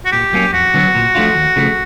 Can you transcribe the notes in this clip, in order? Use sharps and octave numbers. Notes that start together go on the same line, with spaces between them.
F#4
A#2 G4
F#3 A#3 C#4
F2 F#4
D3 F#3 B3
A#2
F3 A3 D4 F4
D#2
C#3 F3 A3